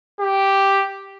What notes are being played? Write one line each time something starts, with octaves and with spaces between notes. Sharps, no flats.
G4